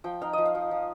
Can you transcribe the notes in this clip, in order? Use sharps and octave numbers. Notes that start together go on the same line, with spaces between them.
F3 G5
D#4 F5
F3 D#5
F5
F3
F3